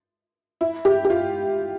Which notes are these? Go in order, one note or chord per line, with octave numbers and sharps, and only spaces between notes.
E4
G4
G4
F4